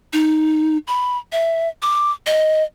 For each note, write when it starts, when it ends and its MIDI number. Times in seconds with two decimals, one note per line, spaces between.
0.13 0.77 63
0.87 1.17 83
1.32 1.68 76
1.82 2.11 86
2.26 2.63 75